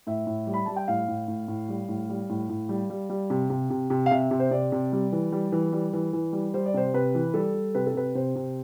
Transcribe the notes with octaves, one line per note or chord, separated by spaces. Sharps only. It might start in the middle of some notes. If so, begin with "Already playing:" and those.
A2 E5
A2
G3
B5
G3 A5
G5
A2 F5
A2
A2
A2
G3
A2
G3
A2
A2
G3
G3
G3
C3
C3
C3
C3
F5
C3 E5
C3
C5
C3 D5
C3
G3
E3
G3
E3
G3
E3
E3
G3
G3 C5
D5
C3 C5
C3 B4
E3
G3 A4
G3
C3 B4
A4
C3 B4
C3 C5
C3